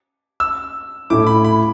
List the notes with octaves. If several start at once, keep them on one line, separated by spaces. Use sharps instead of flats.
E6
A2 A3 E4 D6
B5
B5